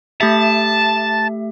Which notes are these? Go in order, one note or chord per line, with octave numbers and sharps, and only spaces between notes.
A3 G4 E5 A5